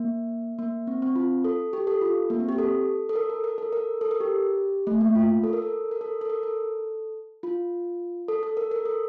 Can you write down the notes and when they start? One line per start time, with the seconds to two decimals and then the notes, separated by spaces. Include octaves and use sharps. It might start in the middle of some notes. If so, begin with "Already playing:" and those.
Already playing: A#3
0.59 A#3
0.87 C4
1.02 C4
1.16 F4
1.44 A4
1.73 G4
1.87 A4
2.01 F4
2.30 A#3
2.40 C4
2.49 G4
2.58 A4
3.09 A4
3.16 A#4
3.30 A4
3.44 A#4
3.58 A4
3.72 A#4
4.01 A4
4.11 A#4
4.20 G4
4.87 A3
5.01 A#3
5.15 F4
5.43 A4
5.53 A#4
5.62 A4
5.91 A#4
6.01 A4
6.21 A4
6.30 A#4
6.43 A4
7.43 F4
8.28 A4
8.43 A4
8.57 A#4
8.71 A#4
8.85 A4